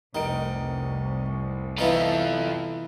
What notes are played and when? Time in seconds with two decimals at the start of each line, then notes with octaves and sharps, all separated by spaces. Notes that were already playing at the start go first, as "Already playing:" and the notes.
0.15 F1 C2 D#4 A#4 D7
1.79 E3 B3 D#4 F4 A4 E5 F5